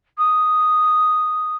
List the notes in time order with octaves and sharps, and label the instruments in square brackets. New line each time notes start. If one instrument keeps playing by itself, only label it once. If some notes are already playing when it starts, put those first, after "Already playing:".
[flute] D#6